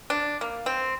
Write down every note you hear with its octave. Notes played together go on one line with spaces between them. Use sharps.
D4
A#3
C4